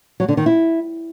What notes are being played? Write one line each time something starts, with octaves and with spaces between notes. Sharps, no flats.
F#3
D3
D#3
E4